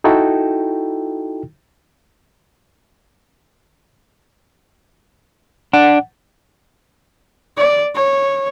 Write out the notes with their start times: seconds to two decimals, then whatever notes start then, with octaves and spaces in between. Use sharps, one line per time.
0.04 D#4 E4 F#4 A4 G5
5.73 D4 F#5
7.57 D5
7.95 C#5